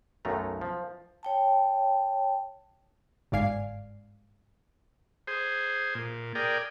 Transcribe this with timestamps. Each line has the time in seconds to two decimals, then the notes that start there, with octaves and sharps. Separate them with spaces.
0.25 B1 F#2 D#3 A3 A#5
0.61 F3
1.23 C#5 G5 A5
3.32 G1 G#2 D5 F5 G#5 C7
5.27 G#4 C5
5.95 A#2
6.35 G#4 A#4 D5 G5